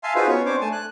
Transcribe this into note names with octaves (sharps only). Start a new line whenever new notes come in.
E5 F5 G#5 A5 C6
D#4 F4 F#4 G#4 B4 C5
B3 C#4 C#5
C4 D4 C5 C#5 D6
A3 G#5 A5
F#6